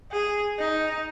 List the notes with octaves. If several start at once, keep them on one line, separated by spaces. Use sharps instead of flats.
G#4
D#4